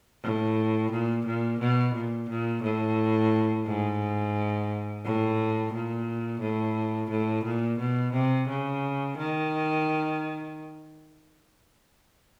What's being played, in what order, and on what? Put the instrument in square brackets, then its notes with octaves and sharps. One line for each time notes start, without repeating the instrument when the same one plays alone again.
[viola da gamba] A2
A#2
A#2
B2
A#2
A#2
A2
G#2
A2
A#2
A2
A2
A#2
B2
C3
C#3
D#3